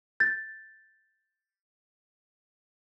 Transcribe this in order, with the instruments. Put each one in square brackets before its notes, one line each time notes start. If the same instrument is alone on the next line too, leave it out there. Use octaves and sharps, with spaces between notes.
[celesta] G6 A6